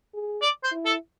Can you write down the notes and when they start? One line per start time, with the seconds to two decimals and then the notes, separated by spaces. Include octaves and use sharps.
0.14 G#4
0.42 D5
0.64 C5
0.72 E4
0.86 A4